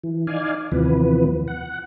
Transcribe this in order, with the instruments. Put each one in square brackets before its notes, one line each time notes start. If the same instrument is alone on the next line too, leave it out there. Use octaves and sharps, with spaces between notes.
[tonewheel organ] E3
D#4 D5 F5 G#5
D#2 C3 E3 F3 B3 B4
F#5